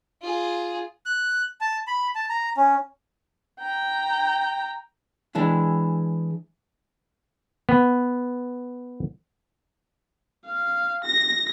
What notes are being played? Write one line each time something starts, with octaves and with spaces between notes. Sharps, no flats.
F4 G#4
F#6
A5
B5
A5
A#5
C#4
G5 A#5
E3 G#3 D4 E4
B3
F5
A#6